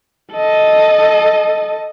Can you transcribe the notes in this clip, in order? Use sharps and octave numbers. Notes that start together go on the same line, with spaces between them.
A4 D#5